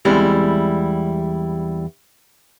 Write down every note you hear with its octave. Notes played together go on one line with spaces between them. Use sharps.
E2 G3 G#3 C4 E4 G4